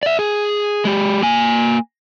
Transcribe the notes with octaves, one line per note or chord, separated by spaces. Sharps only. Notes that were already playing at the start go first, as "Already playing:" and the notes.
D5 E5
G#4
G#3 G4
A#3 G#5